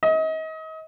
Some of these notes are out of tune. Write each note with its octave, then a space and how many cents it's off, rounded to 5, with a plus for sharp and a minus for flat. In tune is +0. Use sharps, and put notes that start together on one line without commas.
D#5 +35